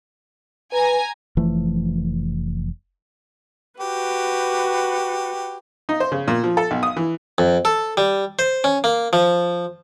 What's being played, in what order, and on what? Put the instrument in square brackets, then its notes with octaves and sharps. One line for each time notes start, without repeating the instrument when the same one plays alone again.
[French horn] B4 [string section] G#5 A#5
[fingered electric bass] F1 E3 F3 A3
[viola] F#4 B4 [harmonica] G4
[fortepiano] D#4
C5
C#3
A#2
F3
A4
B1
D#6
E3
[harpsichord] F2
A4
G3
C5
C#4
A#3
F3